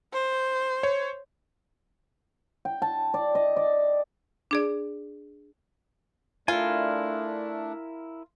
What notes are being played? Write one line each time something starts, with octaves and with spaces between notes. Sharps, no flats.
C5
C#5
G5
A5
D5
D#5
D5
D4 G#4 D5
A3 D4 E4 F4 A#4 G#5